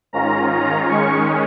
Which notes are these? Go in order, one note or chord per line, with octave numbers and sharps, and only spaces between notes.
G#2 D#3 C#4 F4 A#5
A#5
D#3 G#3 C#4 C#6